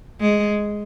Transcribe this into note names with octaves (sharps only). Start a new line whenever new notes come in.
G#3